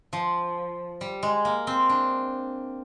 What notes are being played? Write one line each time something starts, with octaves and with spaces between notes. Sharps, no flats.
F3
G3
G#3
A#3
C4
D4